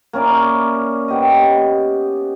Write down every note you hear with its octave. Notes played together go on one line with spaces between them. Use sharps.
A#3 C#4 E4 D5
B3 G4 D#5